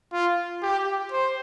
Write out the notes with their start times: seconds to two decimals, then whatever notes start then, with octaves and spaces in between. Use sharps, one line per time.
0.13 F4
0.62 G4
1.12 C5